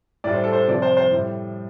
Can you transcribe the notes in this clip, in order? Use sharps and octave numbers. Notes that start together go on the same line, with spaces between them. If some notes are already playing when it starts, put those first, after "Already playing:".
A2 G3 D5
C5
A4
C5
C3 F3 D5
C5
C5
A2 G3